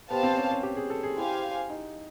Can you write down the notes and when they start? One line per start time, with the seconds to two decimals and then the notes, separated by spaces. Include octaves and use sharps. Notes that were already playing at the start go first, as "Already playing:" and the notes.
0.10 B3 G4 C5 F5 A5
0.23 C4
0.37 C#4
0.51 C#4
0.63 G4
0.76 G#4
0.90 A4
1.03 G#4
1.17 E4 G4 C5 F5 G#5
1.70 D#4